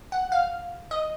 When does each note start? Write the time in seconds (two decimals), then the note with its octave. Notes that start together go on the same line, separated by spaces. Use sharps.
0.12 F#5
0.32 F5
0.91 D#5